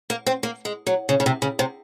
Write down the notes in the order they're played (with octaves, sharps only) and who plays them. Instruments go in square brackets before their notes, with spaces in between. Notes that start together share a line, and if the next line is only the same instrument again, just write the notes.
[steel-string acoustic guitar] A#3
C4
A#3
G#3
F#3
C#3
C#3
C3
C#3
C3